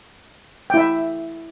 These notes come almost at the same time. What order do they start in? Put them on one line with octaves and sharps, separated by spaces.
G5 E4 E5